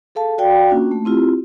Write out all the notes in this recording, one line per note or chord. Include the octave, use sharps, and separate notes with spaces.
G#4 A4 F5 A5
F#4 D5 F5 G5
A#3 C#4 D4 F4 F#4
A3
C4 E4 F4 G4